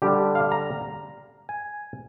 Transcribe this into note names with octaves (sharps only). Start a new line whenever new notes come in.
D3 G3 D4 G4
F5
A#5
G#5